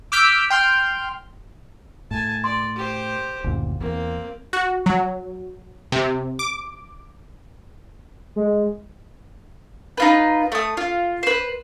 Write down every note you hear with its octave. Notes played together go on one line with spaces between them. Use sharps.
D6 E6 F6 G6 B6 D7
G5 C6 F6 G6
A2 G#5 A5
D5 C6
G4 C5
F#1 D2 A#2
E2 A#3 C4
F#4
F#3
C3
D6
G#3
D#4 F4 B4
A3 D#6
F4
B4 C5